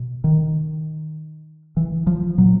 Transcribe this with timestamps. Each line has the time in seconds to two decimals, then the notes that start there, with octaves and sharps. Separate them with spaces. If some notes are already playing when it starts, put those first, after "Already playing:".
Already playing: B2
0.24 D#3
1.77 E3
2.07 F3
2.38 A#2 F#3